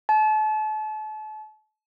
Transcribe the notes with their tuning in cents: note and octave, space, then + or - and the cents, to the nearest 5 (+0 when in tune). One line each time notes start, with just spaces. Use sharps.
A5 -35